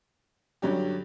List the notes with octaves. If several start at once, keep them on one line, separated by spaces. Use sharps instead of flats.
G2 D3 F#3 C#4 G4